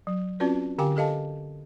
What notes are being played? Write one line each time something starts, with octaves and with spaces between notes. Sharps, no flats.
F#3
C4 C#4 F4 F#4 B4 D5
D3 G4 F5 G5 G#5 D6
G4 A4 D#5 F5 A5